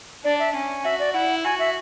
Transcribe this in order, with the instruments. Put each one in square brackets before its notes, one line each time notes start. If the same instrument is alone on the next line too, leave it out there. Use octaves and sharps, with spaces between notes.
[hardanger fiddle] D4 [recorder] D5
[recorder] E5
[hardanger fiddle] C#4
[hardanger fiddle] F#4 [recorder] E5
[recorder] D5
[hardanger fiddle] E4 [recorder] F#5
[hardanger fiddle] F#4 [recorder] G#5
[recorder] E5